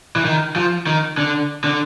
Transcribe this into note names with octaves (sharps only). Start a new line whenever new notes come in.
E3
D#3
F3
D#3
D3
D3